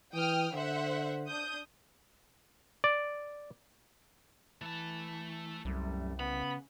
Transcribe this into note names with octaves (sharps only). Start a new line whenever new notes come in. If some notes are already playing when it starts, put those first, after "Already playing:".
E3 G5 D#6 F6
D3 C5 E5 F#5
D4 D#6 G6
D5
E3 A3 A5
C2 F#2 G3 A3
C#3 B3 B5